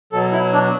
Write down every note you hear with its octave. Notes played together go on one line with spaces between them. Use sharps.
B2 F#3 A4
E4
D4